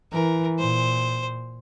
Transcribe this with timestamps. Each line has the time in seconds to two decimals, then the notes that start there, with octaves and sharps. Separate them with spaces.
0.12 E3 A#4
0.59 A#2 C5